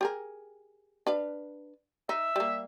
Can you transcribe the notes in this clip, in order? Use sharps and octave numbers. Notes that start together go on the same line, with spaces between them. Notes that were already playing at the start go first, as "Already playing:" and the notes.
G4 G#4 A#4
D4 B4 F5
D#4 E5
G3 A#3